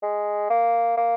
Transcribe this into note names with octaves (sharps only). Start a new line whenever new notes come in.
G#3
A#3
A#3